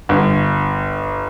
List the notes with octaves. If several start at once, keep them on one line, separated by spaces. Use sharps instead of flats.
G1